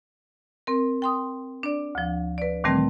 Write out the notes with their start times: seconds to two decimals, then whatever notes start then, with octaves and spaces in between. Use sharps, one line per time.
0.67 C4 A#4
1.02 G5 C6 D#6
1.63 D4 D5
1.95 D2 F3
2.38 B4 D5
2.64 A#2 D#3 E3 G3 A3 C4